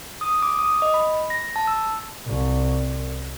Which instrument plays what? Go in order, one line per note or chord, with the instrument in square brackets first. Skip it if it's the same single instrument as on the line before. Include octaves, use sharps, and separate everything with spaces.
[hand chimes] D#6
D6
D#6
D#5
B5
A#6
A5
E6
[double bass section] C2